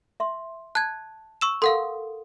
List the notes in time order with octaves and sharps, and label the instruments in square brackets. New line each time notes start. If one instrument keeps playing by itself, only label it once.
[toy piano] E5 C6
[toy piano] A5 [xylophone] F#6 G#6
[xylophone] C#6 E6 E7
[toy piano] A4 A#4 D#6 [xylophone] F5 F#5 C6